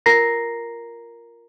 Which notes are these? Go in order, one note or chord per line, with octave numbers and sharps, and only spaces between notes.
F4 A#4 A#5 A#6 C7